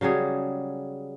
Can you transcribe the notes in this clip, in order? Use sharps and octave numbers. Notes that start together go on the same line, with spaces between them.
C#3 F#3 G3 G#4